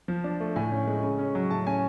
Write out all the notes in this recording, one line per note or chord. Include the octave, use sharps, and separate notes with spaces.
F3
D4
A3
A2 G#5
C#4
G#3
C#3
C#4
F#3
A2 A5
C#4 G#5